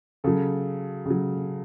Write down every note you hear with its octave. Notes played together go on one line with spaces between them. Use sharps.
C#3 F#3 A4
C#3 F#3